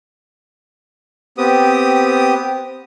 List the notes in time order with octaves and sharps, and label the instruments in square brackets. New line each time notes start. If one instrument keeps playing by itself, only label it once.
[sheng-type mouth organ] B3 C4 G4 D#6